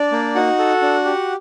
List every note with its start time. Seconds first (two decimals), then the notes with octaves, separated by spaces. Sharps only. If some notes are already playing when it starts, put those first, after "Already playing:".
Already playing: D4 D5
0.12 A#3
0.35 D#4 F#4 F#5
0.59 A4
0.82 D4
1.05 G4